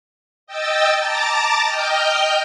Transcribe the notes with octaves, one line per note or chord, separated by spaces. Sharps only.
D#5 G5 E6 A6
A5 A#5 D6 A6
D#5 G5 F6 G6